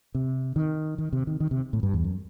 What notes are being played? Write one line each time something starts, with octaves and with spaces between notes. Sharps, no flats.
C3
D#3
D#3
C3
D#3
D#3
C3
A2
G2
E2
F#2